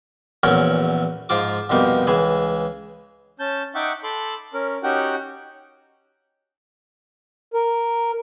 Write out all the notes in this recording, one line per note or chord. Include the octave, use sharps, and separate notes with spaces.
A#1 E2 F#3 A3 C#4 A#4
G#2 F3 F4 D6
C2 F2 B2 A#3 D#4
C#2 E3 G#4
C#4 A5 G6
D#4 E5 F#5 G5 C#6 D6
A4 B5 C6 D6
C#4 A#4
C#4 D#4 F#4 G4 F#5 G5
A#4